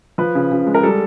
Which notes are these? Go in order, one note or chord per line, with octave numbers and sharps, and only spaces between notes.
F3 B4
C#3
C#3
G#3
A#4
G3 A4